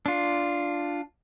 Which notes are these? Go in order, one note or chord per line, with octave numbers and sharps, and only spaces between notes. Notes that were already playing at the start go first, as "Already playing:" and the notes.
D4 F4